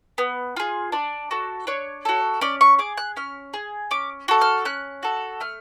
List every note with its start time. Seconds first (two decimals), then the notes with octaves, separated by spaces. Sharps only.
0.18 B3
0.56 F4 G#4
0.92 D4 D5
1.31 F#4 A4
1.67 D4 C#5
2.05 F#4 A4
2.41 C#4 D5
2.61 C#6
2.79 G#4 D6
2.97 F#6
3.16 C#4 F6
3.54 G#4
3.91 C#4 D6
4.28 F#4 A4
4.41 F6
4.65 C#4 F#6
5.03 F#4 A4
5.40 A3 F6